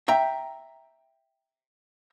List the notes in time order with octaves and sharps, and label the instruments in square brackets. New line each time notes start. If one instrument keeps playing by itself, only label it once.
[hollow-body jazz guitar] E5 G5 A#5